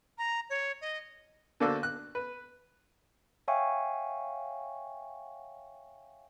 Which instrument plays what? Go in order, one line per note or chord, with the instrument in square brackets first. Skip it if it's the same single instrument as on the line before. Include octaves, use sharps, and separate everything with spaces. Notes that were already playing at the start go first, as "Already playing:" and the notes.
[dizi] A#5
C#5
D#5
[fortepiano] D3 A#3 D4 F#4 A4 C5
F#6
B4
[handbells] C#5 E5 F5 G5 G#5 C#6